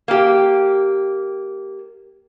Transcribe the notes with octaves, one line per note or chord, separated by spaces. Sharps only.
A#3 G4